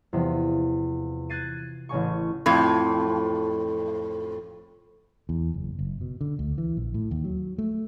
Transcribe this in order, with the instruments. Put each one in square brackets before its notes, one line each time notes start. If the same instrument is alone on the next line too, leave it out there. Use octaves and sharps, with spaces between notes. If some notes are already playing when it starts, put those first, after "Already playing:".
[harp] E2 C3 F3
F#6 G#6 A6 C7 D#7
A1 C#3 G#5 C#6
[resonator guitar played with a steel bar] F2 A2
[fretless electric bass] E2
F#1
F#1
B2
D3
D2
E3
A#1
A2
D#2
F#3
A3